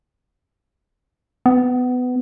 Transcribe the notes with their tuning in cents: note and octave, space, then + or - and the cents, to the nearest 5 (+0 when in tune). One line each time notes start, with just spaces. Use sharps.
B3 +20